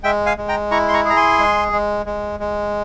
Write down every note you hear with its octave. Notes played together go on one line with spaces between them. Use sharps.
G#3 E5 G5
F5 G#5
G#3
G5 A#5
E4 A#5 C#6
C6
A#5 C#6
G#4 A#5
G#5 C6
G#3
G#3
G#3
G#3